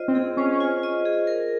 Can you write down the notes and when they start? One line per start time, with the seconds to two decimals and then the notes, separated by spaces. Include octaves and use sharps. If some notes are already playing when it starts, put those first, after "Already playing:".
Already playing: F4 C5 D#5
0.08 C4
0.15 G#4
0.37 C#4 C5
0.60 F4
0.83 D#5
1.05 G#4
1.27 A#4